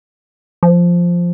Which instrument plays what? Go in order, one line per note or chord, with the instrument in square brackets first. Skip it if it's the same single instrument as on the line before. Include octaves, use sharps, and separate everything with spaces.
[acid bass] F3